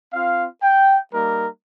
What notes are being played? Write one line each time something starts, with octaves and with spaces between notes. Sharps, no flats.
C4 F4 F5
G5
G3 A#3 D#4 A#4